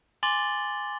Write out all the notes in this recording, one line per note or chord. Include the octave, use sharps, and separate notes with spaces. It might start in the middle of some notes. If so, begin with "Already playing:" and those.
G#5 C6 D6 A6 F#7 G7